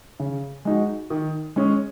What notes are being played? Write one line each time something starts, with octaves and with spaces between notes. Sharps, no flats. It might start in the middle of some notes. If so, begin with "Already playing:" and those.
C#3
G#3 D#4 F#4
D#3
G#3 C#4 G#4